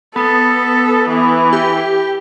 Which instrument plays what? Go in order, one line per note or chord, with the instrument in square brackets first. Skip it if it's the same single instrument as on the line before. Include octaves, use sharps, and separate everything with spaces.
[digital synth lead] B3 [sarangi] A4
[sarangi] E3
[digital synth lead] G4